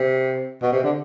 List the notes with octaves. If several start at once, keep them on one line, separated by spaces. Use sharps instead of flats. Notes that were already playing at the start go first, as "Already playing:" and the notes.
Already playing: C3
B2
C3
D3